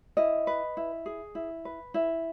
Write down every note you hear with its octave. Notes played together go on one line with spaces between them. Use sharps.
E4 D#5
B4
E4
G#4
E4
B4
E4 E5